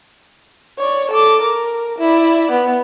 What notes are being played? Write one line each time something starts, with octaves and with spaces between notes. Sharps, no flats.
C#5 D5
A4 D6
A#4
E4 D5
B3